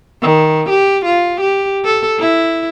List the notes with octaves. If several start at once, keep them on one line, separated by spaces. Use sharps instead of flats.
D#3
G4
F4
G4
A4
E4